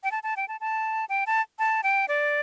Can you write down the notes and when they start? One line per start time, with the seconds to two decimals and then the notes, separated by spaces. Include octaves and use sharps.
0.04 G5
0.12 A5
0.23 A5
0.37 G5
0.48 A5
0.61 A5
1.09 G5
1.27 A5
1.59 A5
1.83 G5
2.08 D5